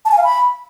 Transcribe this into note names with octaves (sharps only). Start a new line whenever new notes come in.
A5
G#5
F5
B5